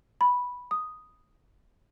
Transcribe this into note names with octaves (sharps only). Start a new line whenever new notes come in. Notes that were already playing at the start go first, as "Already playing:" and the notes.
B5
D#6